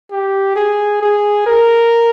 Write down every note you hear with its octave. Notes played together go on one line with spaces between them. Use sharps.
G4
G#4
G#4
A#4